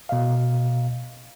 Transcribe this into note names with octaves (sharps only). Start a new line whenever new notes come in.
B2 D#5 F5